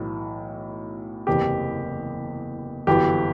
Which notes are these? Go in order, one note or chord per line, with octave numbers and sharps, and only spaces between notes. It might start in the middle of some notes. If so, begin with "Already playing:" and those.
Already playing: B1 A2 E3
F#1 E2 C3 E3 G4
G1 F#2 E3 G4